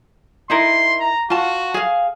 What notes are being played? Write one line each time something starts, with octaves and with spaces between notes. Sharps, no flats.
D#4 E4 A#4 C6
A#5
F4 F#4 A5
G#4 F5